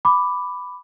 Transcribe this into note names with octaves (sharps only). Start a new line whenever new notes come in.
B5 D6